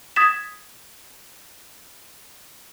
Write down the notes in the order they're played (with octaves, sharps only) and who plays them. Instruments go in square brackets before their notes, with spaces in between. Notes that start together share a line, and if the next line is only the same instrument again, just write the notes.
[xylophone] D#6 G#6 A6 B6 E7